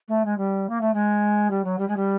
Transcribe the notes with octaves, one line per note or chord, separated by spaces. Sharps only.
A3
G#3
G3
A#3
A3
G#3
G3
F#3
G3
G#3
G3